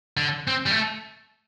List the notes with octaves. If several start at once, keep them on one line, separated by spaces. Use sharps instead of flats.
D3
C4
G3
A3